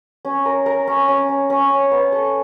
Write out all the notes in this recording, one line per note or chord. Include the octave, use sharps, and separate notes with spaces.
C#4
A#4
A#4
C#4
C#4
C#4
C#4
C#4
B3
A4